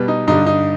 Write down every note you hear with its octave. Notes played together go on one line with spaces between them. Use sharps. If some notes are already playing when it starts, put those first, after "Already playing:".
Already playing: B2 G3 B4
D#4
G2 D3 G3 D#4
D#4